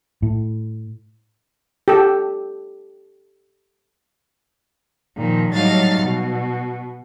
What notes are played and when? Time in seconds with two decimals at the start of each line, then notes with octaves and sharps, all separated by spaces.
0.22 A2
1.88 G4 A4
5.17 A#2 D#3 F3
5.53 A2 F#3 G3 D#4 F5 A6
6.00 B2